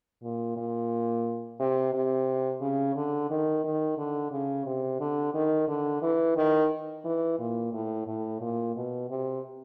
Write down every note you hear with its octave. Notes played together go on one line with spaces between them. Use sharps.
A#2
A#2
C3
C3
C#3
D3
D#3
D#3
D3
C#3
C3
D3
D#3
D3
E3
D#3
E3
A#2
A2
A2
A#2
B2
C3